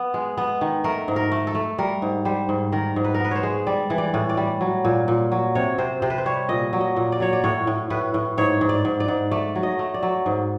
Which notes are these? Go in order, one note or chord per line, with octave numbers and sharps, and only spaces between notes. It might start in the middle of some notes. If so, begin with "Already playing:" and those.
Already playing: B3
G#3
B3
D#3
A3 A#4
G#2
A#4
A3
A4
A3
G3 A#4
G#2
G3 C5
G#2
D#3 A#4
G#2
B4
A#4
B3 B4
C5 C#5
G#3
G3 D5
E3
D5
A2
D5
G3
F#3
A#2
A#2
F#3
C3 C#5
C3 C5
C3 C5
B4
C5
G3 C#5
A#2 D#5
F#3
D#5
A#2
D5
F#3 C#5
D5
A2 C#5
A2
A2 B4
A2
G#2 C#5
G#2
D5
G#2
D5
G#2
A3 D5
F#3
D#5
A3
D5
F#3
G#2